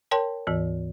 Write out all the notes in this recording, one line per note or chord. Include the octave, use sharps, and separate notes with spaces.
A#4 C#5 G5 A5 C6
D2 G#2 E3